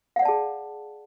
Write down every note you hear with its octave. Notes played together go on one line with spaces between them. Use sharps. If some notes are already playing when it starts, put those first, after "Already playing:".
G#4 D5 F5 F#5 A5